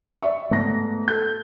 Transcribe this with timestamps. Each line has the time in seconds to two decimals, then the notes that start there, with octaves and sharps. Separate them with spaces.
0.22 D5 E5 C#6
0.51 G#2 A3 B3 A#6
1.08 A4 G6